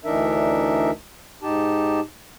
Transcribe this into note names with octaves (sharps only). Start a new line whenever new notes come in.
D2 E3 D4 D#4 A#4 E5
G#2 D#4 G4 A5